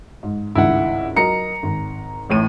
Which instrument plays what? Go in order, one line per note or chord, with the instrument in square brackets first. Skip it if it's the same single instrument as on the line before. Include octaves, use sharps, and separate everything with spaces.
[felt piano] G#2
[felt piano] G#1 C#2 G2 [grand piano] E4 F#5
[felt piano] F#3 A#4 D#5 [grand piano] A#5 C#7
[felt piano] G#1
[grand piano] A1 A2 D#7